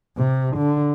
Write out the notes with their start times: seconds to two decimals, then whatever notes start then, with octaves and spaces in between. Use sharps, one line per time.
0.18 C3
0.57 D3